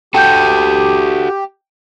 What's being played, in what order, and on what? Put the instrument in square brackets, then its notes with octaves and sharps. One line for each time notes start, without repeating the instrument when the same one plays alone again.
[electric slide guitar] F#4 A4 [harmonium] G4 [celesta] G5 G6